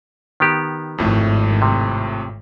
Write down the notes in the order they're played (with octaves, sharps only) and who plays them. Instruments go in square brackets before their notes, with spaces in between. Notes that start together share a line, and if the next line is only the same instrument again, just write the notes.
[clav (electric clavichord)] D#3 B3 G4
[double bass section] G#1 [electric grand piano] F2 A2 A3
[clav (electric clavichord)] C3